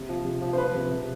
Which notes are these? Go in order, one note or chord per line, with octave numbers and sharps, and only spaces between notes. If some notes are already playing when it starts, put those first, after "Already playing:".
Already playing: C3
F3
C3
F3
C5
F3 B4
C3
C3